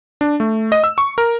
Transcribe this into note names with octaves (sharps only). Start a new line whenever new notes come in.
D4
A3
D#5
E6
C#6
A#4